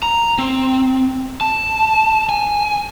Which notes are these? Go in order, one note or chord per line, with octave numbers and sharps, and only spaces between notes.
A#5
C4
A5
G#5